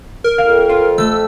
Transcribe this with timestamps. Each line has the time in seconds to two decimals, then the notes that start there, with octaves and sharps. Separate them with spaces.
0.24 A#4
0.38 F2 F5
0.70 F4
0.98 A3 E6